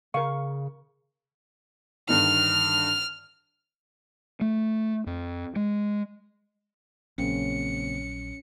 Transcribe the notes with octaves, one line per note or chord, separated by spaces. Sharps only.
C#3 A#4 F5 C#6
G2 D3 D#3 F6
A3
F2
G#3
A#1 C#3 F#3 A#3 C4 C#4 C#7